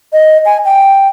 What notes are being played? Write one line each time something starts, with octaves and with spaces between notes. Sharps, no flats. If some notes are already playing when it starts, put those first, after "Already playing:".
D#5
G#5
G5